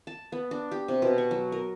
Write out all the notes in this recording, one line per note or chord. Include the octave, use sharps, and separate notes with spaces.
A5
B3
D4
G4
C3
B2
C#6
F#3
A#4